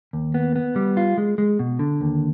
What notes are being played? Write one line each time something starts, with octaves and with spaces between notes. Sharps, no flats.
D#2
B3
B3
G3
F4
G#3
G#3
B2
D3
D#2